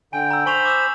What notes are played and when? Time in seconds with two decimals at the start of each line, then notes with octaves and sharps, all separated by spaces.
0.13 D3 G5 G#5
0.31 A#5 E6
0.46 C5 G#5 B5 C#6 F7
0.65 D6 E6 E7